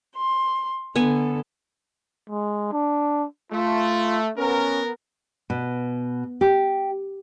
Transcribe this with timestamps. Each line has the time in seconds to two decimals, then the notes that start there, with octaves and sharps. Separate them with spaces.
0.17 C6
0.96 D3 B3 A4 G#5
2.30 G#3
2.72 D4
3.52 A3 F4
4.38 B3 C#4 A#4
5.50 B2
6.41 G4